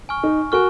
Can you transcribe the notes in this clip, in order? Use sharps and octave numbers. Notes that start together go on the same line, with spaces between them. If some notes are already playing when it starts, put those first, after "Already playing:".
G#5 C#6 F6
D#4
F#4 A#4 G#5 C#6 F6